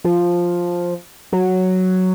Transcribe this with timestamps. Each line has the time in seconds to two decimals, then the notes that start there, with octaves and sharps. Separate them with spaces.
0.04 F3
1.33 F#3